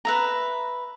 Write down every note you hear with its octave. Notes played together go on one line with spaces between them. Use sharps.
B4 E5 A#5